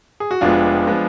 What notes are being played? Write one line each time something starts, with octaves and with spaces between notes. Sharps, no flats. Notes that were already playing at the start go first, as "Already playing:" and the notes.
G#4
F#4
F1 F2 F3 G#3 B3 D4 F4
F3 G#3 B3